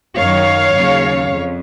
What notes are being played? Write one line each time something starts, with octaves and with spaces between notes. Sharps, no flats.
F#2 D#3 F#3 C#5 F5
D#2 C#3 F#3
F2